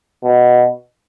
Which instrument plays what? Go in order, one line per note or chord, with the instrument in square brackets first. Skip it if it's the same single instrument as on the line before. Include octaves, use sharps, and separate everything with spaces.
[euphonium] B2